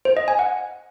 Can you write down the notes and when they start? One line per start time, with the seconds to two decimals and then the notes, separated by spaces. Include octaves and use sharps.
0.05 C5
0.17 D#5
0.28 G#5
0.39 F#5